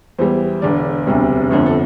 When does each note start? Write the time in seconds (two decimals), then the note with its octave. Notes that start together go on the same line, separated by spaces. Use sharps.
0.19 E2 E3 G3 C5
0.62 E1 E2 D3 D5
1.07 E1 D2 C3 G3
1.50 G1 F2 D3 F3 A4
1.66 A4